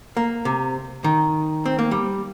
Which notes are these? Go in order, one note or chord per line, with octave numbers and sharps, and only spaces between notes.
A#3
C3
D#3
C4
A#3
G3